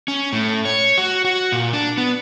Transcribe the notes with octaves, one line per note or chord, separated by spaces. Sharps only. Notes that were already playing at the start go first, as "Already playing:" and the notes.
C#4
A2
C#5
F#4
F#4
A#2
D4
B3